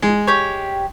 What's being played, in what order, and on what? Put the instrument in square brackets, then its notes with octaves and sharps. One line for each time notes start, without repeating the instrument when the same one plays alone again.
[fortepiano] G#3
[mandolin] G4 C#5